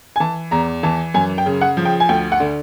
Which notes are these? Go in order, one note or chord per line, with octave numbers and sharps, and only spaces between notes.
G#5
E3 A5
E2 A#5
E3 A5
F#2 G#5
G5
C#3
F#5
F3
G5
G#5
D2 G5
F#5
D3